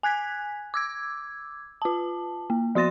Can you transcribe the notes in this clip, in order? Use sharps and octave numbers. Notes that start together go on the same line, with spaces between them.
G#5 F#6 G#6 B6
D6 E6 G#6
F4 A5
A#3
F3 F#4 C6 A6 A#6